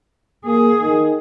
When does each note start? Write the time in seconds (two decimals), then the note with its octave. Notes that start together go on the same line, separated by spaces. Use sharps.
0.46 A#3 G#4
0.82 D#3